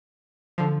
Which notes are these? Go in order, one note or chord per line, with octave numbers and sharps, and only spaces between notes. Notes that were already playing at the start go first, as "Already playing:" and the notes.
D3 F3